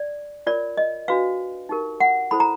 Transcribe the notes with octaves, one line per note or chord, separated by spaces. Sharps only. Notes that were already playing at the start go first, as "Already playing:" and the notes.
Already playing: D5
F4 A#4 C#5 D5
D#5
D4 F#4 B4 F5
D#4 G4 A#4
F#5
E4 A4 C5 B5
A#5